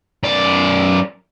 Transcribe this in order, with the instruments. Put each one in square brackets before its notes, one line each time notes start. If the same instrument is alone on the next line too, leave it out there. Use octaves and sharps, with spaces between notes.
[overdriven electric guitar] F#2 D5